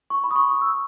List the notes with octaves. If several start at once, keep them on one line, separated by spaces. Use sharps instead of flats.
C#6
B5
D#6
C#6
D#6
E6